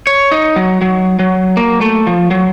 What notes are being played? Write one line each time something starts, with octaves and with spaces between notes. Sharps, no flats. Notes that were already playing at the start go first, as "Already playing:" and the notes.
C#5
D#4
F#3
F#3
F#3
A#3
A3
F3
F#3